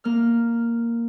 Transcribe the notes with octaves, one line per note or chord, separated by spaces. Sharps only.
A#3 F6